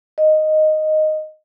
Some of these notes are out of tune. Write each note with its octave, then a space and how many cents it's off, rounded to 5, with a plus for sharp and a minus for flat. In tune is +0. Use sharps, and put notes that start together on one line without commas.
D#5 -5